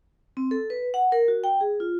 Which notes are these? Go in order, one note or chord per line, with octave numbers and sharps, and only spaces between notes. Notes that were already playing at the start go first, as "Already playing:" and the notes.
C4
A4
B4
F#5
A#4
F#4
G5
G#4
F4